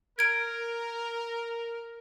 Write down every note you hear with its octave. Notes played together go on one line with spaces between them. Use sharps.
A#4 G#6 D7